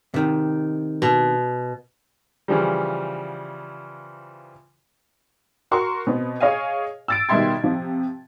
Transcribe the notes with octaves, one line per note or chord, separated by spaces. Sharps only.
C3 D#3
B2
C#3 E3 F3 G3
F#4 A#4 C6 C#6
B2 B3 C4
G#4 C#5 D#5 F5 G#5
E6 A6 D7
B2 D#3 G3 E5 C6 G#6
C3 F3